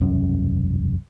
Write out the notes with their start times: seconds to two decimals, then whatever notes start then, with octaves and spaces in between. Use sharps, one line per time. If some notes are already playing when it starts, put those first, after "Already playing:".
0.01 E1 C2 F#2 C#4